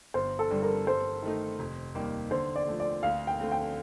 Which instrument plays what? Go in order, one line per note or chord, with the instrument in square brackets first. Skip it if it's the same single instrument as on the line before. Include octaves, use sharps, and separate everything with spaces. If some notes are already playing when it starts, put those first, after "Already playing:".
[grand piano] G1 [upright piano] C5
[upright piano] A4
[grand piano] G2 D3 G3
[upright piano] A#4
[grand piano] G2 [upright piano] C5
[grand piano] D#3 A3 D#4
F1
D#2 D#3 G3 A#3
[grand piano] D3 [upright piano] C5
[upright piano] D5
[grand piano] F3 A3
[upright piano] D5
[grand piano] D2 [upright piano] F5
[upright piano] G5
[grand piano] D3 A3 C4
[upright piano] G5